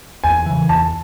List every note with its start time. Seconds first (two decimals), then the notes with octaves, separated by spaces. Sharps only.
0.24 E2 G#5
0.46 C#3 E3
0.69 E2 A5